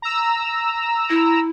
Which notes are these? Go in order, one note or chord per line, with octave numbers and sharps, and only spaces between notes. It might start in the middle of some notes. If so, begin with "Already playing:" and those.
A#5 E6
E4